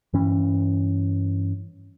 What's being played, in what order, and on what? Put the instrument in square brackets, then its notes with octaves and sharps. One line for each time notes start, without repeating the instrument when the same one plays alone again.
[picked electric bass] G2 E3 C#4